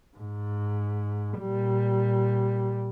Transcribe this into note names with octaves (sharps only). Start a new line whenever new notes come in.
G#2
A#2 G3